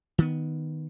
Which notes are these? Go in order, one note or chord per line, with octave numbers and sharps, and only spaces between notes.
D#3 B3